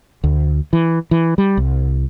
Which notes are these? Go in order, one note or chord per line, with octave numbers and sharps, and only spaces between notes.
D2
E3
E3
G3
C2